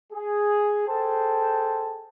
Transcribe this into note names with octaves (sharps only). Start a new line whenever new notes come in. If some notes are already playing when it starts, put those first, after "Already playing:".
G#4
G#4 A4 C5 G5 A5